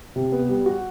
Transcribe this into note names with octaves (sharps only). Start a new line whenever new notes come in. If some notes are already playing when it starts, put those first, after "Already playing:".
C3
B3
G3
F#4